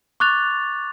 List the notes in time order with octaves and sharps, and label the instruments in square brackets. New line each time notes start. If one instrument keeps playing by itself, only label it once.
[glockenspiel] C#6 D6 F#6 A6 F7